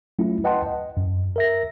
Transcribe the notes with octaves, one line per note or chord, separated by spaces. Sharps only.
F#3 A3 C#4 E4 F4
B4 D#5 F#5 G5 A5 C6
D#5
F#2
A#4 E5 A#6